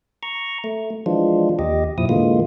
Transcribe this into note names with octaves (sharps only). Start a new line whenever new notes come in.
A#5 C#6
A3
E3 F3 G#3 D4 F4
D#2 G4 D#5
F2 A#2 F3 E4 D#6
A2 D3 E3 G#3 A#3 F4